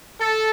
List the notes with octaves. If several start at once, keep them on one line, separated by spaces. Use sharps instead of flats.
A4